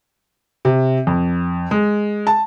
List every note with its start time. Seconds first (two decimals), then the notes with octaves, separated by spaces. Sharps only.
0.65 C3
1.07 F2
1.71 G#3
2.27 A5